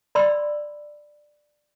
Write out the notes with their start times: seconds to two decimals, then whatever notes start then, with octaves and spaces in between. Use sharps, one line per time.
0.15 D5 B5 C6 E6